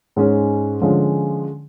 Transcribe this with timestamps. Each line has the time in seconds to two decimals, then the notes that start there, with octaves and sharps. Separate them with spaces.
0.16 G#2 G#3 C#4
0.82 D3 F3 G#3 C#4